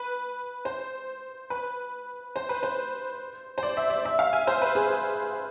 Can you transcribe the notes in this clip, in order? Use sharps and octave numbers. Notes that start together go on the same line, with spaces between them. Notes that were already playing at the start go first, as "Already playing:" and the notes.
Already playing: B4
C5
B4
C5
B4
C5
C5
D5
E5
D5
E5
F5
G#5
C5
B4
G#4